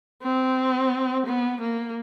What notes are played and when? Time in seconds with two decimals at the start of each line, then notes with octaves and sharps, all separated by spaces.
0.23 C4
1.27 B3
1.62 A#3